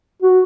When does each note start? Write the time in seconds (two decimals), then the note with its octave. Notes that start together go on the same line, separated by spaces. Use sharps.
0.22 F#4